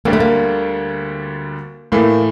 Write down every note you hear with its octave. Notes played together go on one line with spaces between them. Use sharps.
D2 D3 G3 A#3 D4 G4
A3
A#3
A2 E3 A3 A#3